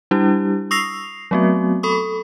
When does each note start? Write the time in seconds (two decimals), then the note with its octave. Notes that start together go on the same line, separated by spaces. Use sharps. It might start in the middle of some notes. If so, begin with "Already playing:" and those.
0.11 G3 D4 E4 G4
0.71 C#6 D#6 E6 A#6 C7 F7
1.31 F#3 A3 B3 C4 F#4
1.83 A4 B5 C#6 D#6